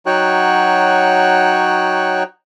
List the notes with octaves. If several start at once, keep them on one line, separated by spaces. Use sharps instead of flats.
F#3 D#4 F#4 C#5 G5 F#6